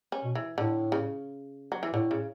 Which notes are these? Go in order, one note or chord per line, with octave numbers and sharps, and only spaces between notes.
C#4
B2
E3
A2 D3
C#3
F#3
E3
A2 D3
C#3